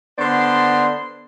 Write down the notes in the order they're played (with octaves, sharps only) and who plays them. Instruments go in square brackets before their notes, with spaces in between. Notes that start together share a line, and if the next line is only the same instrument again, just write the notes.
[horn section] D3 B3 C5 D5 C6